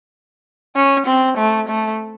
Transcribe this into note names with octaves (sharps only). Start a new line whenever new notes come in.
C#4
C4
A3
A3